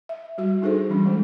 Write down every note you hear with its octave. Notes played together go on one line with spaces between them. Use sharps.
E5
G3 F#4 E5
D4 D#4 G#4 A4 C5
E3 G3 C#4 D4
E3 G#3 A3 C5